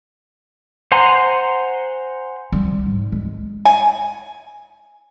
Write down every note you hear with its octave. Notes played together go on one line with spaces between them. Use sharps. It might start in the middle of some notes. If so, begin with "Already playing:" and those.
C5 F#5 G#5 A#5 C6
G3
G#2
G#3
G#5